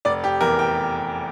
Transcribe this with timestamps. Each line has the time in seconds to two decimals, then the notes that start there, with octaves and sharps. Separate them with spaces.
0.05 F1 D5
0.24 G4
0.41 E2 E3 A#4
0.59 G5